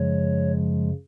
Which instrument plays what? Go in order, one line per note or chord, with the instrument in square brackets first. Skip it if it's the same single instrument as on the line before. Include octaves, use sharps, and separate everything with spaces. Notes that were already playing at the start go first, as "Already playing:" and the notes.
Already playing: [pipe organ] F#2 C#3 F3 G#3 C#5